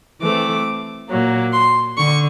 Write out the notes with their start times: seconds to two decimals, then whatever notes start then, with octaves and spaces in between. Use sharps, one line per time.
0.21 E3 A3 C4 D6
1.09 A#2 F#3 A#3
1.53 C6
1.97 D3 C#6